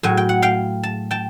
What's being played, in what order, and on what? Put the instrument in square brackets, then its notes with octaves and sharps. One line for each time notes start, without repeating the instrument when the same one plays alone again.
[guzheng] A2 F#3 G#5
G5
F#5
F5 G5
A5
G5 A5